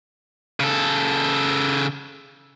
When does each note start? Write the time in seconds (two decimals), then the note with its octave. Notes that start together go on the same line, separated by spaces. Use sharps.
0.60 C#3 A4